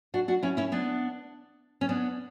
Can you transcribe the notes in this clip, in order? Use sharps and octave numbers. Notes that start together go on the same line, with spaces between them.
D4 F#4
D4 F#4
C#4 E4
C#4 E4
B3 D4
C#4
B3 D4